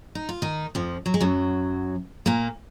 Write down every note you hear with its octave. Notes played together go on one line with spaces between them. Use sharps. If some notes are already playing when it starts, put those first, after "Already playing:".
D#4
F4
D#3 D#4
F2 F3
F#3
G#3
F#2 F#3
A#2 A#3